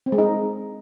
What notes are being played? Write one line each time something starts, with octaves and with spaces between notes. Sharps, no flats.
C4
G#3
D#4